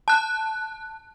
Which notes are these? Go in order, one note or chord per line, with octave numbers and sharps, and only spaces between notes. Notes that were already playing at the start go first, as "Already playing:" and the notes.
A5 F#6